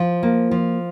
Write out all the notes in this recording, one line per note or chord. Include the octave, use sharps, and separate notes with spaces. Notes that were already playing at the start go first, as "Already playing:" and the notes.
Already playing: F3 F4
A#3
F3